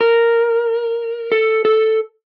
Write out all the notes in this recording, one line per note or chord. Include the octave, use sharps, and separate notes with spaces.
A#4
A4
A4